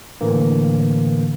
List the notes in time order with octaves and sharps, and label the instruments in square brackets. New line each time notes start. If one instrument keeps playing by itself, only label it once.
[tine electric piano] A2 D3 E3 A#3